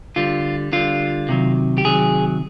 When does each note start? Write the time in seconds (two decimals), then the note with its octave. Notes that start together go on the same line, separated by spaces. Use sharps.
0.16 D3 G3 F4
0.73 D3 G3 F4
1.29 C3 D#3 F#3
1.78 G4
1.84 C3 D#3 F#3 G#4